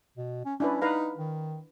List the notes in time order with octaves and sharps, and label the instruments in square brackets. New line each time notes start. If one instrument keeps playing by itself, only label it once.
[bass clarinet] B2
C#4
[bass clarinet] C#4 [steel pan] D4 E4 B4
[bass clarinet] D#4 [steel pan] B4 F5 A#5
[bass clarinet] D#3